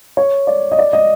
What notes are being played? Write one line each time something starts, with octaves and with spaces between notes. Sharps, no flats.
C#5
D5
D#5
D5
D#5